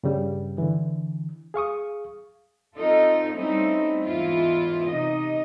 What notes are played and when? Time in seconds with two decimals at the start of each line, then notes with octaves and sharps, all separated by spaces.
0.04 G2 C#3 G3
0.58 D3 E3
1.54 G#4 F5 C#6 D#6
2.74 C4 D#4 F4 A4
3.32 G3 A3 C4 C#4 D#4 E4
4.05 E2 G#2 E4 F4
4.88 C3 D#4 D#5